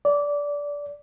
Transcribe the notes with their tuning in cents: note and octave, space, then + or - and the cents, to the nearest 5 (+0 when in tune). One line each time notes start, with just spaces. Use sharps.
D5 -20